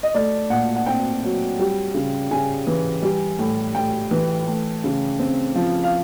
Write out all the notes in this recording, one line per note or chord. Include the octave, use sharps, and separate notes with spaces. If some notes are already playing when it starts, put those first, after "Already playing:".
D#5
A3 D5
A#2 F#5
F#5
C4 G5
F#3
G3
C#3
C#3 G#5
E3
G3
A2
A2 G5
E3
A3
C#3
C4
F3
F5